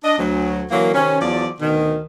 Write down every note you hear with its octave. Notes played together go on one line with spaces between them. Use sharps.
D4 D#5
D2 F#3
D3 E3 F#3 A#3
C3 D#3 C#4
E2 F3 F#3 D5
D2 B2 D#3